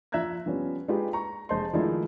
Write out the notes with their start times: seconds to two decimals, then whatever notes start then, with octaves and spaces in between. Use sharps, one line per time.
0.12 F3 E5 A#5 F#6 G#6 A#6
0.46 F3 G3 B3 C#4
0.88 G#3 D#4 F4 G4 B4 F5
1.13 A#5 C#6
1.49 F1 G#3 C5 D#5 A5 C6
1.73 D#3 F3 G#3 A3 D#4 E4